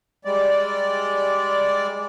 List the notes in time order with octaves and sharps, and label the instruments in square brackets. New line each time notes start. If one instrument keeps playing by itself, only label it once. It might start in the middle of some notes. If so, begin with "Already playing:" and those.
[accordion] G3 G#3 D5